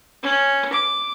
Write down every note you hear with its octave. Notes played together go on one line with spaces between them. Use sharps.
C#4
D6